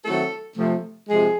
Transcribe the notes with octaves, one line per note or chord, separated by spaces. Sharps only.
D#3 F#3 A3 C4 E4 A4
C3 F3 A3
C3 F3 G#3 G#4